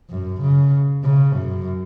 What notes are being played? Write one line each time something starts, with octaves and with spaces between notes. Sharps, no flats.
F#2
C#3
C#3
F#2